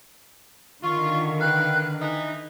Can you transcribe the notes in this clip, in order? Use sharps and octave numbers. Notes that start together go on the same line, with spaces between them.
D3 D#3 F4 C#6
B4 F5 G5 F#6
E3 D#4 E5